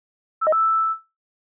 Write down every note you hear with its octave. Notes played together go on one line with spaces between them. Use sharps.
E6
D#5
E6